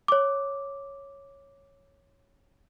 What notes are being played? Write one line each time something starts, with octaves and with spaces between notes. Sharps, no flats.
C#5 D6